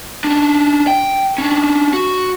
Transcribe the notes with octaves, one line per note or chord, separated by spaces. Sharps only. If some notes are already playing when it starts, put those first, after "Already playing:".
C#4 D4
G5
C#4 D4
F#4